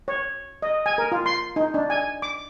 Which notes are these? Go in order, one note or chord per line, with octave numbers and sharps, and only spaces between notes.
C#5
D#5
G#5
A#4
F4
C6
D#4
D4
G#5
D6